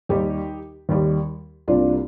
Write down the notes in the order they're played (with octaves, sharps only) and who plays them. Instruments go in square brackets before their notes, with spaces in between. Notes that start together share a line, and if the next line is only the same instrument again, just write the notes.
[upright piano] D#2 D#3 G3 D#4 G4
D#2 D#3 G3
C2 C3 G3 A#3 D4 F4